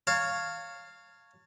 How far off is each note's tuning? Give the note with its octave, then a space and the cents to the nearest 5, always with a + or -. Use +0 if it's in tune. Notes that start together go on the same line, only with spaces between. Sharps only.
C#5 +0 F5 +0 A5 +40